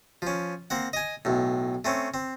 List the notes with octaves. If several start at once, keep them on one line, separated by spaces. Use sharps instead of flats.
F3 C#4
A#3 C4 F#5
D#5 G#5
B1 A2
A3 C4 C#4
C4